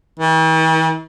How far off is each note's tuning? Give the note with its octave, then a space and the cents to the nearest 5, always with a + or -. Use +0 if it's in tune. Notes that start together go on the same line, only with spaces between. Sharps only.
E3 -45